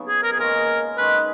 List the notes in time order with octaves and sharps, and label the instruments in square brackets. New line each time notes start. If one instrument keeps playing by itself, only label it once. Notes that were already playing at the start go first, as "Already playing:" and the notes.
Already playing: [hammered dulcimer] C#3 F#3 B3 D#4
[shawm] G#4
A#4
G#4
[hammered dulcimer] A#2 G#3 C#4 [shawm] A#4
[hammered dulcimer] D#3 G#3 C#4 [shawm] B4